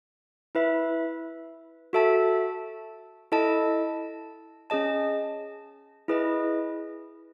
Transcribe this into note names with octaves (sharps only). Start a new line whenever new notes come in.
E4 B4 E5
F#4 A4 E5 A5
E4 A4 D#5 A5
C#4 G#4 D#5 A5
E4 G#4 B4 D#5